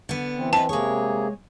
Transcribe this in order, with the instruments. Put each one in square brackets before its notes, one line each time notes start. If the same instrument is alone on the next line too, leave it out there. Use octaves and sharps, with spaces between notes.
[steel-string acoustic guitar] D3 B3
[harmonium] E3 C4
[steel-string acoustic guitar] B4 D#5 [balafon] A5
[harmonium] C3 A#3 G#4 [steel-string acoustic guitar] G#3 C#5